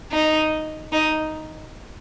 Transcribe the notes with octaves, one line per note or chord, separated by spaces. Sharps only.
D#4
D#4